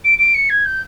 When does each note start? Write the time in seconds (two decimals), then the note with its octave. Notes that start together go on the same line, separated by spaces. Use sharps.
0.04 D7
0.19 D7
0.34 C#7
0.49 G#6
0.65 G6